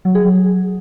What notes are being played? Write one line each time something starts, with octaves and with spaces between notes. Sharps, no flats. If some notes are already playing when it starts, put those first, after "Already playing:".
F#3
G#4
F#3